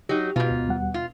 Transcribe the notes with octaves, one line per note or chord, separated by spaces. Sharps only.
F#3 D#4 G4
G#2 B2 F4
D2
D#2 G3 F#5
F4